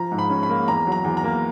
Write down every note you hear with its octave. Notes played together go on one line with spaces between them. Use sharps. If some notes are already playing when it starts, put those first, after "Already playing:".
Already playing: F3 A#5
G#2
B5
C#4
B5
A#3
E2 A#5
F#3
A#5
E2
A#5
A#3